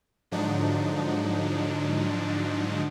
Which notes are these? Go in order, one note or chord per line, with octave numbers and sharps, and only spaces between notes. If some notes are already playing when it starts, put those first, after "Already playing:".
G#2 D3 F3 F#3 D4 D#4